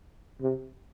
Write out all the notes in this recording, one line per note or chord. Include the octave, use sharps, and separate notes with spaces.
C3